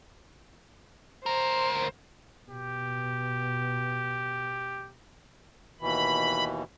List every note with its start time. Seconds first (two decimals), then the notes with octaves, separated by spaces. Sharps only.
1.26 D2 A#4 C5
2.50 B2 G4
5.81 D#2 B2 E3 B5